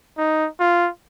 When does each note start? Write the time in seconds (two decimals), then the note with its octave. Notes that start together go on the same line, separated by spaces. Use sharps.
0.18 D#4
0.60 F4